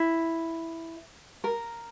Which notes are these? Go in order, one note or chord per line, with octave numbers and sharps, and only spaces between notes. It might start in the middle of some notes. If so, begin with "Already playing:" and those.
Already playing: E4
A#4